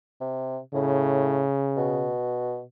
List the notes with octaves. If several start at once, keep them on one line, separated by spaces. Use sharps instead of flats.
C3
A2 C#3
B2